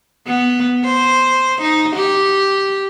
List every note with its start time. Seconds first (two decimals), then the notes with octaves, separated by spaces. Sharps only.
0.27 B3
0.85 C5
1.62 D#4
1.96 G4